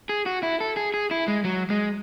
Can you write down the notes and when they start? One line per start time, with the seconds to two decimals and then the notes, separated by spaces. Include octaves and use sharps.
0.09 G#4
0.26 F#4
0.43 E4
0.61 A4
0.77 G#4
0.94 G#4
1.11 E4
1.28 G#3
1.44 F#3
1.70 G#3